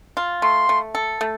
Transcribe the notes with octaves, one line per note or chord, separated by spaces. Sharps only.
F4
A3 C6
A3
A4
A3